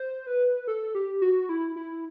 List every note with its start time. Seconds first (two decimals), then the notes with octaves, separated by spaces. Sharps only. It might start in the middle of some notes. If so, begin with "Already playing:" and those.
Already playing: C5
0.27 B4
0.67 A4
0.95 G4
1.22 F#4
1.49 E4
1.76 E4